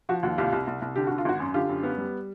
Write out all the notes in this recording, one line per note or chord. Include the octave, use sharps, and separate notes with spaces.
F3 F#4
D#2 F#4
C2 F4 G4
C2
C2
C2
D3 G4
D3 F#4
F4
G#1 F#4
F#2
D3 F4 G4
F#2
B3
G3